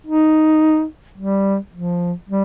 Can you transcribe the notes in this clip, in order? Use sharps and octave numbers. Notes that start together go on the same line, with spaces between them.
D#4
G3
F3
G3